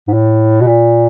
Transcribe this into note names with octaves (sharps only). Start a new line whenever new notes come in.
G#2
A2
B2
A#2